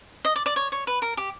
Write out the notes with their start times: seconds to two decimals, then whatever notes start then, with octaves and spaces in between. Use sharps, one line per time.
0.25 D#5
0.36 D5
0.46 D5
0.56 C#5
0.72 C#5
0.87 B4
1.02 A#4
1.17 G4